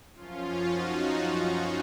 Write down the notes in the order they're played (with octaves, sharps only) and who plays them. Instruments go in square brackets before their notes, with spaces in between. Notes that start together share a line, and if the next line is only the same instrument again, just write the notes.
[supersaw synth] F#2 F3 C#4 F4
D#4 F#4